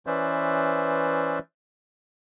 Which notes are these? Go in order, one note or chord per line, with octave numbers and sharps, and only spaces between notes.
E3 C#4 B4 C5 D5 E5